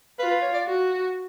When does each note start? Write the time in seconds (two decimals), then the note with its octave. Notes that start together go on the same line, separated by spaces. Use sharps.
0.19 F4 B4
0.31 B4
0.42 C#5
0.54 D5
0.66 F#4